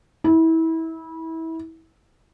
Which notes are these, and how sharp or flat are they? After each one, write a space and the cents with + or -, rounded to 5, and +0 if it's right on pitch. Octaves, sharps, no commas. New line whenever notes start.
E4 -25